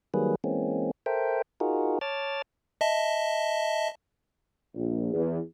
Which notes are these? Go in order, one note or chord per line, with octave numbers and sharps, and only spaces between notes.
D#3 F#3 G3 A#3 G#4 B4
E3 G#3 A#3 C4 C#4
A4 A#4 C5 E5 G5
D#4 F4 F#4 G#4 A#4
C#5 A5 D6 F6 A6
D#5 E5 A5
A#1
E2